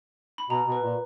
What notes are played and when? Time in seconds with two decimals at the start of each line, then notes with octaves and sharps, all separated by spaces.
0.38 B5
0.50 B2 A#5
0.67 B2
0.72 B4
0.83 A#2